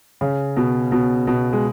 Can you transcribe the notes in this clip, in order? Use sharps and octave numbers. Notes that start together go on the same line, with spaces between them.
C#3
B2
B2
B2
G#3